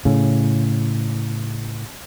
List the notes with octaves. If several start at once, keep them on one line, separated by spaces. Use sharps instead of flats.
A2 C#3